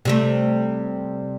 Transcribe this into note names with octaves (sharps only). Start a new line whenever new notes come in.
C3 G3 A3